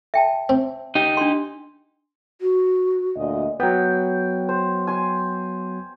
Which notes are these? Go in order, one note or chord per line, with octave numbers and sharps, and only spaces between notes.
E5 G5 A5
C4
D#4 G4
D4 C6
F#4
D2 A#2 D#5
F#3 B3 G5
C5
G#5 C6